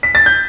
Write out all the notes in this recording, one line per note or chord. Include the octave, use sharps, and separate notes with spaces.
B6
A6
G6